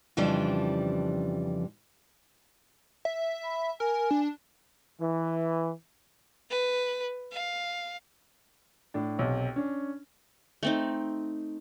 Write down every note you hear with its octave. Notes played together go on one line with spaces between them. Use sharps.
F2 C#3 E3 F3 G3 D4
E5
B5
A#4 G#5
D4
E3
B4
F5
A2 D4
B1 C3
C#4 D4
A3 C4 D#4